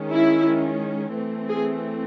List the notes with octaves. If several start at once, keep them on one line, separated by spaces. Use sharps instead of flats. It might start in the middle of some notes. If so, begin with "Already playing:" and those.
Already playing: D#3 G#3 C#4
E4
E3 A3 C4
G#4